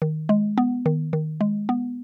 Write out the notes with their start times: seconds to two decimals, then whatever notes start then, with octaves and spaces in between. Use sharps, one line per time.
0.02 D#3
0.29 G#3
0.58 B3
0.86 D#3
1.13 D#3
1.41 G#3
1.69 B3